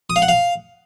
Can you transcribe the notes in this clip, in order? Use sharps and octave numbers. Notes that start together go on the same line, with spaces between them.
D#6
F5
F#5
F5